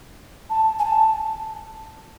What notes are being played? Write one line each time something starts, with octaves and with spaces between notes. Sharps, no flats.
A5
G#5
A5